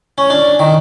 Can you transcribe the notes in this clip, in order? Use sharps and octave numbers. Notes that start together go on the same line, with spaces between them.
C#4
D4
D#3